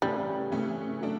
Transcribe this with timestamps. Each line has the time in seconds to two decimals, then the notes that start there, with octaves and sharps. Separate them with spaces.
0.02 C#3 E3 G3 A3 C#4
0.52 C#3 E3 A3 C#4
1.01 F#3 A3 D4